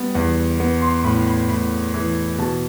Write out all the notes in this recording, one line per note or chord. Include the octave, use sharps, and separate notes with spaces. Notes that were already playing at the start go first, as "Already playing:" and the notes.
Already playing: G3 B3
E2
B3
C6
A2 B5
B5
A2 B5
E3
B2 A5